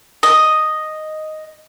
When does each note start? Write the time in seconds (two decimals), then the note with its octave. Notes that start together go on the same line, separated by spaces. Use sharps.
0.23 D#5